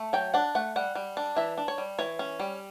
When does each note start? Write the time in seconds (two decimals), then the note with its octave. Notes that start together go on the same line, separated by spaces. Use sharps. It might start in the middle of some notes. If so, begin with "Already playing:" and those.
Already playing: A3
0.13 F#3 G5
0.34 D4 F#5
0.55 A3 F#5
0.76 G3 F#5
0.95 G3
1.17 D4
1.36 E3 E5
1.58 D4
1.68 C#5
1.78 G3
1.99 E3 C#5
2.19 C#4
2.40 G3